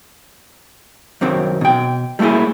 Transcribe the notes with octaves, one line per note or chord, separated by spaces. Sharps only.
F#2 C3 D#3 C4
B2 G5
G3 A3 A#3 E4 G#4